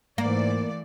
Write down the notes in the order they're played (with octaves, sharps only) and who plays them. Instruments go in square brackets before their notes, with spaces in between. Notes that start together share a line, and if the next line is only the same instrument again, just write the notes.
[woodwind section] G#2 [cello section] E3 A3 D5 [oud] A#3